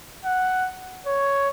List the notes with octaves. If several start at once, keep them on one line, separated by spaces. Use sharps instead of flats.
F#5
C#5